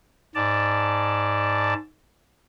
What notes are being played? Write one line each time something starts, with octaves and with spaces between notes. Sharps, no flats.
G#2 D5 A5